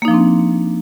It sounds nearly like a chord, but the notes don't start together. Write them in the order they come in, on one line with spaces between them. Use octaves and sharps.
A#3 D#4 F3 D4 C4